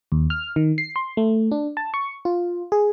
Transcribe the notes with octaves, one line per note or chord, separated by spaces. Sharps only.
D#2
F6
D#3
C7
C6
A3
D4
A5
C#6
F4
G#4